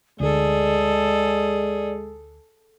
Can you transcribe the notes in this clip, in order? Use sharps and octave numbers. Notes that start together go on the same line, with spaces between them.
D2 D3 G#3 G#4 A4 D5